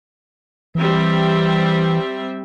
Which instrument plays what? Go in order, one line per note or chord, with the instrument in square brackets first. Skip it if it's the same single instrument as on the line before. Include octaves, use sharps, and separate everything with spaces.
[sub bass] E3 [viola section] G3 C4 E5